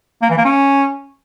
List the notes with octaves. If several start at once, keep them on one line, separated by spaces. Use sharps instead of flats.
A#3
E3
A#3
C#4